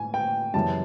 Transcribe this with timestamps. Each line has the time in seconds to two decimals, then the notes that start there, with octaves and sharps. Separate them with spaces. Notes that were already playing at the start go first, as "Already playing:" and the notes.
Already playing: A2 G#5
0.14 G5
0.54 F#2 C#3 E3 G3 A5